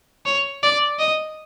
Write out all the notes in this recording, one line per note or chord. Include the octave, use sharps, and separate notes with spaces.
C#5
D5
D#5